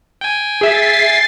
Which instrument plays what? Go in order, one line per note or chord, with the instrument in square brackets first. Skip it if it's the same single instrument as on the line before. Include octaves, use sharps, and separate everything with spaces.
[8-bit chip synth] G5 G#5
[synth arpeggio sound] G#4 E5 B6 [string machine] A6 C7